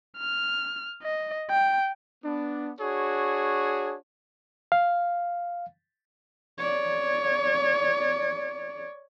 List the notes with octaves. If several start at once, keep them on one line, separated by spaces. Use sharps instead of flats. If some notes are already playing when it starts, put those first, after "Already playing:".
F6
D#5
G5
B3 D4
D4 F#4 G#4 C#5
F5
C#5 D5